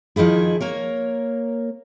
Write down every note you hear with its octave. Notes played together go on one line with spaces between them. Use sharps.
D#3 F3 D#4 E4 G#4
A#3 A#4 C#5